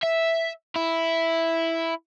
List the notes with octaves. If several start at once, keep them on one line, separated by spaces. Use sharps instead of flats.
E5
E4